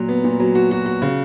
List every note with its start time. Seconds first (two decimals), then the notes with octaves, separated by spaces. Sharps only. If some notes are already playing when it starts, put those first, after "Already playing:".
Already playing: A#2 F#3
0.08 B3
0.24 A#2
0.40 F#3
0.55 F#4
0.71 F#4
0.86 F#4
1.02 C#3